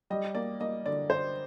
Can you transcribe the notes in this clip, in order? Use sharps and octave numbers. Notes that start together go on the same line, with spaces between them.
G3 D#5
A#3 D5
A#3 D#5
D3 D5
D3 C5